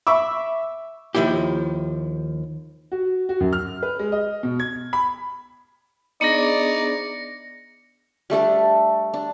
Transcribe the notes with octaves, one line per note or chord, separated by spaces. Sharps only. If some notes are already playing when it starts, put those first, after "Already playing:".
E5 B5 C#6 D6 E6
D#2 D#3 F3 E4 G4
F#4
F#4
F#2
F6
B4
G#3
D#5
B2
G#6
B5
B3 D4 D#4 G#4 D5 A#6 C#7
G3 A3 D4 A4
D4